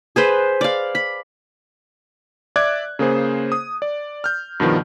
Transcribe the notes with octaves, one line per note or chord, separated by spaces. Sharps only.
G#4 B4 C5
D5 F5
B5
D5 E5 D6 F#6 G#6
C#3 A#3 G#4 C5
D#6
D5
F6 G6
G2 B2 D#3 F3